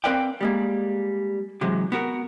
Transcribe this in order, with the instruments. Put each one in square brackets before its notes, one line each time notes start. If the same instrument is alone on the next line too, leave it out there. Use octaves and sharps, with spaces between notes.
[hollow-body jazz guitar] C4 A#4 B4 D5 F5 G5
G3 G#3 A#3
C3 E3 F#3 G#3
B3 F#4 A#4